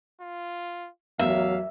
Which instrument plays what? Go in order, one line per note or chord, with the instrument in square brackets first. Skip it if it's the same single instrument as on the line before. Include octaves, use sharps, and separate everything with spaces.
[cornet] F4
[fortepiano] A1 E2 A#4 [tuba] F#3 [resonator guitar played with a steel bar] E5 [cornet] F5